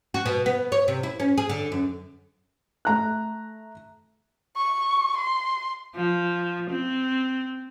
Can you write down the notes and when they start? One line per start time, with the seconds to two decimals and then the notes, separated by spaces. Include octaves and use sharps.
0.14 F#4
0.26 B2
0.46 B3
0.72 C#5
0.88 C3
1.03 E4
1.20 C#4
1.38 G#4
1.49 D3
1.72 F#2
2.85 A3 A#5 F#6
4.57 C#6
5.17 C6
5.95 F3
6.70 C4